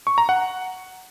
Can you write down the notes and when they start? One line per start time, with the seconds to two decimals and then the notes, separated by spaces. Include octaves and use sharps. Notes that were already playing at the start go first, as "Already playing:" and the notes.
0.07 C#6
0.18 A#5
0.29 F#5